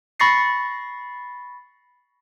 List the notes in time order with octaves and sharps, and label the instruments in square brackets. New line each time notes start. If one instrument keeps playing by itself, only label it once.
[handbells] B5 C#6 A6 A#6 C7 C#7